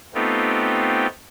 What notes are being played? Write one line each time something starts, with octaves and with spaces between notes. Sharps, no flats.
A3 B3 C4 D#4 F4 G4